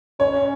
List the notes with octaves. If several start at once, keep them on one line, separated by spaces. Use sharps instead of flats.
C#4 C#5